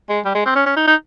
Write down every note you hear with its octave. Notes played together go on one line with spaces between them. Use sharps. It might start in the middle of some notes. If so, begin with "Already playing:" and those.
G#3
G3
G#3
C4
C#4
C#4
D#4
D#4